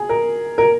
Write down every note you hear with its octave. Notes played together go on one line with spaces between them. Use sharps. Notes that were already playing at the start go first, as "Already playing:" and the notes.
Already playing: G#4
A#4
A#4